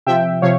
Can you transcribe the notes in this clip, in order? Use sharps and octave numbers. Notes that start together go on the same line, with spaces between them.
C3 F3 E5 G5
C3 F3 C#5 F5